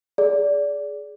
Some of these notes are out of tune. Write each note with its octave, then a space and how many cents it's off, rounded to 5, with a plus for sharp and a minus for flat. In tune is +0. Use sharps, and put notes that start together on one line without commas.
G#4 +15 D5 -20